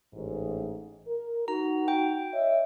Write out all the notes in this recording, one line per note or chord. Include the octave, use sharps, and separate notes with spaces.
A1 G#2
A#4
D#4 F#4 A#5
G5
C#5 D#5 E5